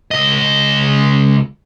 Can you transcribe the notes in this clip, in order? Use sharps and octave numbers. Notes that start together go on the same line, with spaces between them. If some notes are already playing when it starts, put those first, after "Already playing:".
C#2 D#5